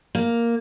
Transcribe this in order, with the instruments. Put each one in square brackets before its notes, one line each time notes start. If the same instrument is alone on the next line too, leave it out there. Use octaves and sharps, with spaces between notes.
[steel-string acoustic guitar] A#3